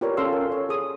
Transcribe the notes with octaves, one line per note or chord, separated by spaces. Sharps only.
F4 G4 A#4 B4 C#5 D5
C#4 A4 F5 C6 E6
A#4
C#5
G#4 D#6